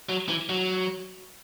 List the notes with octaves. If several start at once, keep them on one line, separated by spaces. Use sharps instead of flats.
F#3
E3
F#3